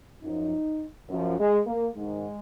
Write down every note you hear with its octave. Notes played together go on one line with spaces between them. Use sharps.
F#2 F3 D#4
F#2 F3
G#3
A#3
G#2 D#3 G#3